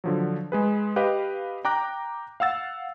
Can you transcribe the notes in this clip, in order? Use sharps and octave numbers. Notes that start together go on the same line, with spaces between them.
D3 F3 F#3
G#3 G#4 B4
G4 B4 D#5 F5
G5 A#5 D6 F#6 A#6
F5 F#5 E6 A6